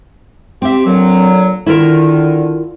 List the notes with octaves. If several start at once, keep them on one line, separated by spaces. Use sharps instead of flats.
C4 G4 E5
A#2 D3 F#3
D3 D#3 E4 F4 A#4